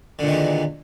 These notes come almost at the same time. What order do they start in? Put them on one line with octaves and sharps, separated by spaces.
D3 A#2 D#3 E2